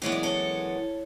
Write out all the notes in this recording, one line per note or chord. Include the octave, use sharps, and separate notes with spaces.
F#2 E3 G#3 B3 C#5
D5
A4 C#5